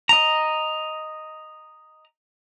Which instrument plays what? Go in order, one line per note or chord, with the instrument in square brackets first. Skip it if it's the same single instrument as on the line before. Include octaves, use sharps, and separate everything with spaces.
[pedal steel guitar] D#5 A#5